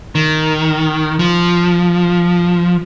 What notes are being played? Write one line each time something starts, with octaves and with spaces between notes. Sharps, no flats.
D#3
F3